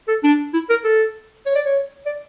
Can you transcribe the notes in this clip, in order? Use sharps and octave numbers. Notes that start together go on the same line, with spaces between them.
A4
D4
E4
A#4
A4
C#5
D5
C#5
D5